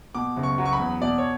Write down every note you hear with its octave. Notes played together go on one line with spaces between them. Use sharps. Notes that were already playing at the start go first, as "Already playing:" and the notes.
B2 D6
F#1
C#6
F#3
C#6
B5
E2
B2 D5
C#5